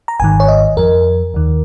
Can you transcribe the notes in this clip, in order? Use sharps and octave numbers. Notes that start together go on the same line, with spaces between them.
A#5
G#1 G#2 D#3 G#5
C#5
D#5
F2 F3 A#4
D#2 D#3